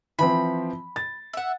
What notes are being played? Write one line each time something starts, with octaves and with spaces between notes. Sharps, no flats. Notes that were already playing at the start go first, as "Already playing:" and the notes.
E3 F3 C4 B5
A6
E5 F#5